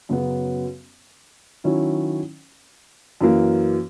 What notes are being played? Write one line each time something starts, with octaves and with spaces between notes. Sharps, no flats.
F#2 C#3 F#3 B3
D#3 F#3 C#4 E4
F#2 E3 A#3